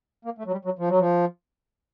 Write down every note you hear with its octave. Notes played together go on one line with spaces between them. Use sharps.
A#3
A3
F#3
G3
F#3
F3
F#3
F3